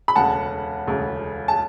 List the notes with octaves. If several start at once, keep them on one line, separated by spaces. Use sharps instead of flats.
B5
E1 D2 C#3 F#5 A5
E1 D2 C#3
A5